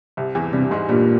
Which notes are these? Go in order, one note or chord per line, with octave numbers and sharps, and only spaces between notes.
C2 C3
E2 E3
G2 C3 G3
G#2 G#3
G2 A#2 G3